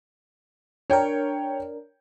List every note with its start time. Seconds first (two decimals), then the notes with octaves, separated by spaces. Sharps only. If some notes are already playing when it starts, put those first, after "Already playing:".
0.90 D4 A#4 C#5 G5